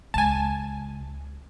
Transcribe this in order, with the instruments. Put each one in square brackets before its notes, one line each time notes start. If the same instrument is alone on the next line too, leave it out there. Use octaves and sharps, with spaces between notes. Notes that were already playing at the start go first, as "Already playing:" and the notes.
[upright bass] C#2 [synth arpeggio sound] G#5 A5